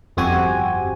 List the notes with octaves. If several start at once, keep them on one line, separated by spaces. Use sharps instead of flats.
G1 F2 C4 F#4 G4 G#5